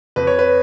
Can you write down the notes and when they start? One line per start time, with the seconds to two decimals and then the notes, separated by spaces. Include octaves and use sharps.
0.16 F2 B4
0.27 C#5
0.39 B4